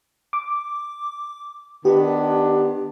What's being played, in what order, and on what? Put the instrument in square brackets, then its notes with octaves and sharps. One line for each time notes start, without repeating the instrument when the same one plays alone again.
[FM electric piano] D6
[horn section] D#3 B3 D4 [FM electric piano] G4